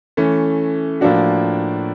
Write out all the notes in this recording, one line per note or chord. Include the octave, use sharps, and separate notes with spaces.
E3 A3 C#4
A2 F3 A#3 D4 F#4